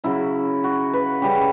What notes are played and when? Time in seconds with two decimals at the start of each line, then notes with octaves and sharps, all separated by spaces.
0.04 C#3 F#3 C#4 E4
0.64 F#4
0.93 B4
1.22 C#3 G3 C#4 G4